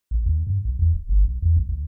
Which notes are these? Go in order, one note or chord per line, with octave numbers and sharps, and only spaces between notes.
A#1
D#2
G2
B1
E2
D1
G1
B1
E2
B1
D2